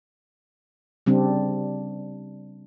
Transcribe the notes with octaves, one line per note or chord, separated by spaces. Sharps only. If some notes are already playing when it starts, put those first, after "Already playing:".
C#3 G3 C4 D4